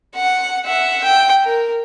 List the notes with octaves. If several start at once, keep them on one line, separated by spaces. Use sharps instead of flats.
F#5
E5 F#5
G5
A#4